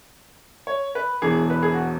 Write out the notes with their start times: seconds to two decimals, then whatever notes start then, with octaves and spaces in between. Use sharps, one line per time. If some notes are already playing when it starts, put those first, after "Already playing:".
0.67 C#5
0.95 B4
1.22 E1 E2 E3 G#4
1.50 B4
1.63 G#4
1.74 F#4